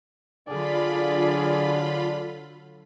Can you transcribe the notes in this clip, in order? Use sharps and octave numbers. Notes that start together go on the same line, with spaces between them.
D3 F#3 D4 F4 G#4 D5 B5